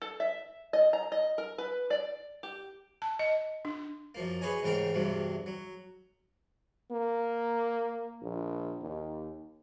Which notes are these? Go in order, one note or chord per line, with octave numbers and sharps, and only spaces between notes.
A4
E5
D#5
A#5
D#5
A#4
B4
D5
G4
A5
D#5
D4
F#2 F3 A#3
G#4 B4 C#5 D#5 G#5
A1 G#2 C#3 G4 A#4 G5
E2 G2 C3 F#3 G3
F#3
A#3
A#1
D#2